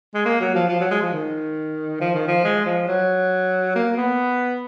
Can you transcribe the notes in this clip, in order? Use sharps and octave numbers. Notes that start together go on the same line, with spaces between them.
G#3
A#3
F#3
F3
F3
F#3
G#3
F3
D#3
F3
D#3
F3
G#3
F3
F#3
A#3
B3